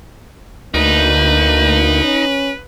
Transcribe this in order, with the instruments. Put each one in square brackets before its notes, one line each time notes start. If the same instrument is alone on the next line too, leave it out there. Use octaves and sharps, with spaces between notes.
[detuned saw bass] D2 [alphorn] A#3 [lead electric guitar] D#4 [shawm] B4
[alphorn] C#4